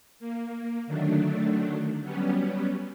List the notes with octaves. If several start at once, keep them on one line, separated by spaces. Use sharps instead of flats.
A#3
D3 D#3 F#3 A3 D4
F#3 G3 B3 C#4